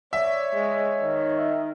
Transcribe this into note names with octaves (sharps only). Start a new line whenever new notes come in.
C#5 D5 E5
G#3
D#3
E5